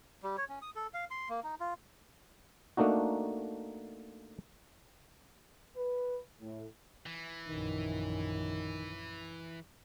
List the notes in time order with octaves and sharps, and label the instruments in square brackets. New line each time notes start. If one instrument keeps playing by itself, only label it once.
[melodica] G3
C#5
C#4
D#6
A4
F5
C6
A#3
D#4
F4
[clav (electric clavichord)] A3 A#3 D4 D#4 F#4
[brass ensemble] B4
A2
[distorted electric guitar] E3
[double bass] A#1 F#2 [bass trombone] D#3